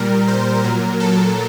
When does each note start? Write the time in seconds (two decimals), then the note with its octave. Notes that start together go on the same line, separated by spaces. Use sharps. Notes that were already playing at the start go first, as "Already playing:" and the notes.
Already playing: A#2 G3 A#4
0.28 C5
0.64 A#2 F#3 A#4
1.00 A4